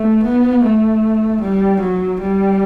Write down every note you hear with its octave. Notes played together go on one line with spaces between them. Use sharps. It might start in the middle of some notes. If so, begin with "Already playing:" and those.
Already playing: A3
B3
A3
G3
F#3
G3